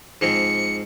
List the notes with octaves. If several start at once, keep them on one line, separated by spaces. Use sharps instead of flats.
G#2 F3 C4 C#7